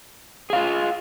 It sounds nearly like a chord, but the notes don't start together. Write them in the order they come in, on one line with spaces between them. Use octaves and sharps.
G#4 F5 F4